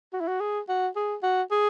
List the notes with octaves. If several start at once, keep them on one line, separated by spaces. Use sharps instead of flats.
F#4
E4
F#4
G#4
F#4
G#4
F#4
G#4